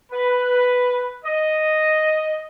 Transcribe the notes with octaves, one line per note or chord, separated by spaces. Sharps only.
B4
D#5